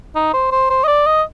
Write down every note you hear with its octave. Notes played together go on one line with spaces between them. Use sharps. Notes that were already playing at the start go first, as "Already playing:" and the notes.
D#4
C5
C5
C5
D#5
D5
D#5